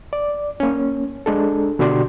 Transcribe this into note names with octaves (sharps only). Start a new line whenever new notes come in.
D5
A#3 C#4
G#3 D4 A4
B2 D3 F#4 G4 D5 C6